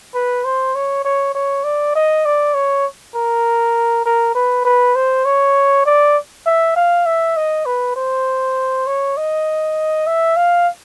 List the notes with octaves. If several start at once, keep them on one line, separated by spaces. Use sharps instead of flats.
B4
C5
C#5
C#5
C#5
D5
D#5
D5
C#5
A#4
A#4
B4
B4
C5
C#5
D5
E5
F5
E5
D#5
B4
C5
C#5
D#5
E5
F5